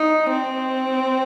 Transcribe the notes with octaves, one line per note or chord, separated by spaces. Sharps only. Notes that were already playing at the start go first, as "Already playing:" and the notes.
Already playing: D#4
C4